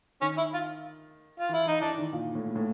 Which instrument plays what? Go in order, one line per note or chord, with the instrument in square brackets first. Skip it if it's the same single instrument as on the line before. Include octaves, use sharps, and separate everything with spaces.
[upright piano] D#3 [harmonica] C#4
[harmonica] E4
F4
F4
[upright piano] E3 [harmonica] E4
[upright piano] E3 [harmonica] D#4
[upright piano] E3 [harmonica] D4
[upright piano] D#3
A#2
A2
A2